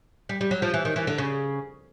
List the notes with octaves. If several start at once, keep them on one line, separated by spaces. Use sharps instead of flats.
G3
G3
F#3
F3
E3
D#3
E3
D3
C#3